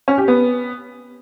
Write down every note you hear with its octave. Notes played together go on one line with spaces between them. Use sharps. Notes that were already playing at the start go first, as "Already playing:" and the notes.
C#4
G4
B3